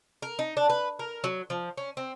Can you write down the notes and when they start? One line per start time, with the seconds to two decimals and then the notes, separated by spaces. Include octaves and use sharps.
0.22 A#4
0.39 D#4
0.57 D4
0.70 B4
0.99 A#4
1.24 F#3
1.50 F3
1.77 C#4
1.97 C4